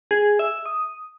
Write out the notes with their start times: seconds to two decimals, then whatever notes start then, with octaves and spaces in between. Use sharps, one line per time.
0.11 G#4
0.39 E5
0.66 D#6